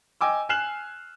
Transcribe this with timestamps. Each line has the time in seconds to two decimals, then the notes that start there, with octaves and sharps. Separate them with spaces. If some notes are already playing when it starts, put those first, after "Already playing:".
0.21 D#5 G5 G#5 D6 E6
0.49 G#5 F6 F#6 C7 E7 F#7